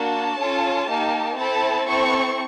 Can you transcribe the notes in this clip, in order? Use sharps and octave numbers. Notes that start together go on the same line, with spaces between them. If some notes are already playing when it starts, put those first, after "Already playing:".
Already playing: A#3 D4 F#4 A5
C#4 F4 A4
A#3 D#4 G4
C4 E4 A4 A5
C4 E4 A4 C#6